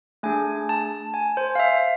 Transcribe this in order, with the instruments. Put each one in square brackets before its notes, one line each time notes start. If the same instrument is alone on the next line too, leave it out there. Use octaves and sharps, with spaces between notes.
[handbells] A3 D4 G#4 G#5
A5
G#5
C5
F5
E5